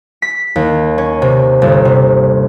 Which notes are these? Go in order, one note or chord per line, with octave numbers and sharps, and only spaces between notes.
B6
D#2
C#4
C3
G1
C3